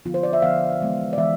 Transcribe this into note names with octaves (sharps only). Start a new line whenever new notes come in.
D3 F3 B3 F4
C5
D5
E5
D3 F3 B3 F5
E3 G#3 B3
D5
E3 G#3 B3 E5